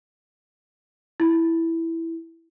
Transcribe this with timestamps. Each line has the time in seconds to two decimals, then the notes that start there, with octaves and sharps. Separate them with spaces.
1.20 E4